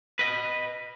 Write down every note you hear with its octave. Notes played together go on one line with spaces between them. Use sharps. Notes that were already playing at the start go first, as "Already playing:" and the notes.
B4 D#5